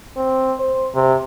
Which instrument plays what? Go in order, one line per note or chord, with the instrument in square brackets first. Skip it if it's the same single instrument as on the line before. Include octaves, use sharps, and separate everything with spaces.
[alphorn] C4
C5
C3